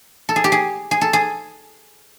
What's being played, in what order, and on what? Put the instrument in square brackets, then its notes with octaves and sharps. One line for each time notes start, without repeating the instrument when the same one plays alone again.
[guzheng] A4
G#4
G4
G#4
G#4
A4
G#4